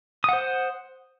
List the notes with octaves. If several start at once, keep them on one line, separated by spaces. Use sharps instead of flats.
C5 F#5 D#6